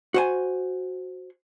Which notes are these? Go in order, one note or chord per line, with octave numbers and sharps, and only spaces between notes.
F#4 C5 G#5